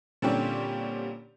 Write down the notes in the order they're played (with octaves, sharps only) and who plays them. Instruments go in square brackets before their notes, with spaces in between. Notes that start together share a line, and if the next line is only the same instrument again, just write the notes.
[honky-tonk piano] A#2 D3 G3 C4 C#4 G4